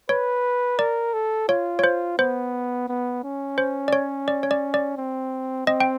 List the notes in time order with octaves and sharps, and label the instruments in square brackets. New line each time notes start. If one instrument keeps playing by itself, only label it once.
[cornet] B4 [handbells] C#5
[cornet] A#4 [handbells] D5
[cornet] A4
[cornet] F4 [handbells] C#5
[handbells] C#5
C5
[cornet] B3 [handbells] C5
[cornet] B3
C#4
[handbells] C5
D5
C#5
D5
C#5
D5
D5
[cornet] C4
[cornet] C4 [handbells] D#5
[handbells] G5